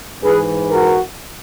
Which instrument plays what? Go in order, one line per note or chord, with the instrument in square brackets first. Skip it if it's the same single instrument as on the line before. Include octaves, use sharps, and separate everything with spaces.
[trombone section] G#2 E3 G#4 B4
F#4 A#4